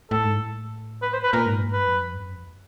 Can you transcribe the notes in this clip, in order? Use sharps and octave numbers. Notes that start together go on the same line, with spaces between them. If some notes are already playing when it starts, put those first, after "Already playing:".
A2 A4
G#2
A2
B4
C5
B4
A#2 A#4
G#2
G2
G#2
G2 B4
F2
F#2
F2
G2
F#2
F2